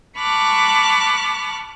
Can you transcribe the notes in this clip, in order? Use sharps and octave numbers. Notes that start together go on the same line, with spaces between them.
A5 B5 C#6 D6 F6 F#6